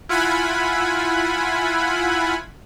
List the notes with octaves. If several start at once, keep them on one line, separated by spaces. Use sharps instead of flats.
E4 F4 F#5 G#5 B5